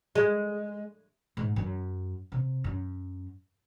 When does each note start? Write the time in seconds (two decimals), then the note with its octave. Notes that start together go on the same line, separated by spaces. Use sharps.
0.15 G#3
1.37 G#2
1.56 F#2
2.32 C3
2.64 F#2